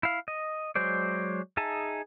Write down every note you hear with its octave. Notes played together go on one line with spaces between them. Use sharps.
E4 F5
D#5
F#3 G#3 C5 D5
D#4 G#4 E5 G#5 A5